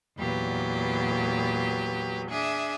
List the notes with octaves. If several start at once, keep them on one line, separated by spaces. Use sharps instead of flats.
E2 A#2 F#3 G4 B4
D4 G#4 E5